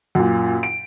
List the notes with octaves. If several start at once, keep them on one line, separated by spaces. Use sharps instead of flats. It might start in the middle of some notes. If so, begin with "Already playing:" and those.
F#2 A#2
D7